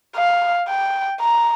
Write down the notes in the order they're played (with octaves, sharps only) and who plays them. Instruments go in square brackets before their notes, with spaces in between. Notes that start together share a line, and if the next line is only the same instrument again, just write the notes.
[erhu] F5
G5
A#5